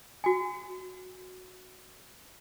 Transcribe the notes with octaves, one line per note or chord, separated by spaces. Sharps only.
F#4 G#5